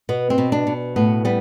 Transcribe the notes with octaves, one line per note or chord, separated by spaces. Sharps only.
B2 B3
C4
B2
D4
B2
A2 B3
G3 B3